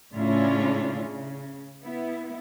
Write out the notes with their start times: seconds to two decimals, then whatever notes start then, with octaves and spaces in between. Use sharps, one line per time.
0.13 A2 C#3 C#4 D4 E4 F4
1.02 C#3
1.84 B3 E4